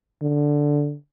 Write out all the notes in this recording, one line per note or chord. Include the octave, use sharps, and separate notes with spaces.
D3